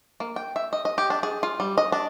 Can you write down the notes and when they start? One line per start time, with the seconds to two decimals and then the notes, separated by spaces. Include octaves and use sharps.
0.20 A#3
0.36 G5
0.56 E5
0.73 D#5
0.85 D#5
0.98 G4
1.10 D4
1.23 G#4
1.43 F4
1.60 G3
1.78 D#5
1.92 D4